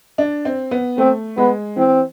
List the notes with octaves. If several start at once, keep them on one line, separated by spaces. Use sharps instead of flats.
D4
C4
B3
A3 C4
G#3 B3
E3 C4